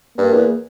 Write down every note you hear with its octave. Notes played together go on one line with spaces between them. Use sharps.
G2 A#3
E2